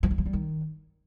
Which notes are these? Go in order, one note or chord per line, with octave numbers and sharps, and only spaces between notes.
F3
F#3
F3
G3
D#3